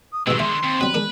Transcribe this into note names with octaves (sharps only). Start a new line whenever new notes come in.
D#6
G2 B2 D3 D#3 G#3 E6
E5 C6
D#2 C4
F#3 G3 B4
G#3 D4 A#4